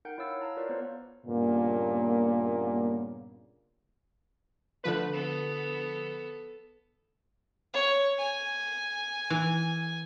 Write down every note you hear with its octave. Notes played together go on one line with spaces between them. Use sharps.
D#4 A#4 F#5 G5 G6
E4 C#5 F5 E6 A6
F5 A5 A#5
F4 A#4 B4 C#5 D5
B3 A#4 C5
G2 A#2 C#3 A#3 B3
D3 F3 A3 B4
B3 A4
C#5
G#5
E3